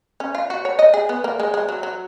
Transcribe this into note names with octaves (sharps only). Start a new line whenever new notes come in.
C#4
F4
F#4
C#5
D#5
G#4
B3
A#3
G#3
G#3
F#3
F#3